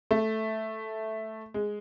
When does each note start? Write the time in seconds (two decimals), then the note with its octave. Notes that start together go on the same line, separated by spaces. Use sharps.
0.11 A3
1.54 G#3